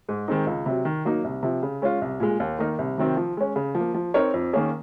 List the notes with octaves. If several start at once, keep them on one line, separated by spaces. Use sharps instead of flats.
G#2
D#3 G#3 C4 D#4
C#2
C3 F#3
D#3
F#3 A#3 D#4
C2
C3 F3
C#3
G#3 C#4 F4
C2
A#2 G#3
D#2
D#3 A#3 D#4 A#4
C2
C3 D#3 F#3 C4
F3
G#3 C#4
C#3
F3
A#3
F3
C4 D#4 A#4 C#5
F2
D#3 A#3 C#4 G#4